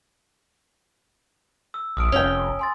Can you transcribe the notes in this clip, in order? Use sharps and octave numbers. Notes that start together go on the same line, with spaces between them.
E6
A#1 D#6 F6 D7
F1 C#4 G5
G#5 C6 A6